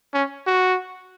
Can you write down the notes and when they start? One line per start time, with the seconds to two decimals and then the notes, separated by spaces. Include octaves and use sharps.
0.14 C#4
0.47 F#4